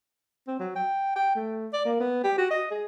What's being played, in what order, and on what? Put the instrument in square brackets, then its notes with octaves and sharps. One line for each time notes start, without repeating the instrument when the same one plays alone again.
[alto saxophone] C4
F#3
G5
G5
A3
D5
A#3
B3
G4
F#4
D#5
G#4